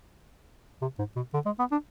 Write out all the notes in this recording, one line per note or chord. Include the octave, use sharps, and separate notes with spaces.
C3
G#2
B2
D3
G#3
B3
D4